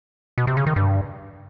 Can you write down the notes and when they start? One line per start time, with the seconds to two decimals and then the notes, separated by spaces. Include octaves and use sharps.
0.38 B2
0.47 C3
0.57 C#3
0.66 D#3
0.76 G2